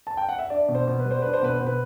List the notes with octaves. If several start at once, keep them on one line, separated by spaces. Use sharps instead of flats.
A5
G5
F#5
E5
D4 D5
B2
C5
B2
B4
G3
C5
D4 B4
C5
B2 B4
C5
B2
B4